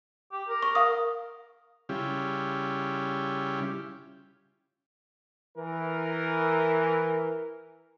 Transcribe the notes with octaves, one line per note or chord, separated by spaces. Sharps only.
G4
A#4
C#6
F5 D#6
C#3 G3 C#4 E4 F4 G4
E3 A#4